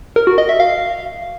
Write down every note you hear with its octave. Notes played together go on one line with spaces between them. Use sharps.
A#4
F#4
D#5
E5
F5